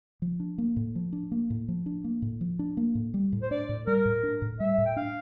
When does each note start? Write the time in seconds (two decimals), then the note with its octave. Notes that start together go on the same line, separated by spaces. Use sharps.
0.22 F3
0.40 D4
0.58 A#3
0.76 A2
0.95 F3
1.13 D4
1.32 A#3
1.50 A2
1.68 F3
1.86 D4
2.04 A#3
2.22 A2
2.41 F3
2.59 D4
2.77 A#3
2.95 A2
3.14 G3
3.32 A2
3.42 C5
3.51 D4 D5
3.69 A2
3.87 G3 A#4
4.05 A2
4.23 D4
4.42 A2
4.59 G3 E5
4.78 A2
4.86 G5
4.96 D4 F5